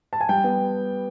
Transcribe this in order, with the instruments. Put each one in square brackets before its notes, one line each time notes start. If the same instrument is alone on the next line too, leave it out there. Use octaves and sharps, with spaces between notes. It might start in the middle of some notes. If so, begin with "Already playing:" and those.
[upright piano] A5
G#5
G3 G5
B3